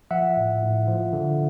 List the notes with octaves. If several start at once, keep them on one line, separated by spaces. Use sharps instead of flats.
F3 E5 F#5
A2
A2
F3
D3